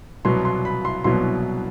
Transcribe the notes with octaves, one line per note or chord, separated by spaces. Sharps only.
C2 B2 F#3 B3 C6
C6
B5
C6
C2 B2 F#3 B3 C6